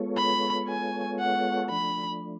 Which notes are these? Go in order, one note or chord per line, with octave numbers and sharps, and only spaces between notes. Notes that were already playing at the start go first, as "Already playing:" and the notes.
Already playing: G#3 B3 F4 A4 C#5
B5
G#5
F#5
F3 A3 D4 B5